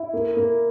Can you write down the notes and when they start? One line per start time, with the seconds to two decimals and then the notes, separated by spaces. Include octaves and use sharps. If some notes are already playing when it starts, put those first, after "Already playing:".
Already playing: E4
0.13 A#3
0.37 A#3